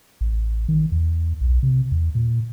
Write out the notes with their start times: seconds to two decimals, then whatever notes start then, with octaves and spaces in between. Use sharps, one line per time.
0.21 A1
0.68 D#3
0.92 E2
1.41 B1
1.63 C3
1.92 E2
2.15 A#2